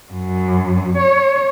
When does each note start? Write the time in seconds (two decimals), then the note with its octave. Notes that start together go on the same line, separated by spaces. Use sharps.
0.12 F#2
0.97 C#5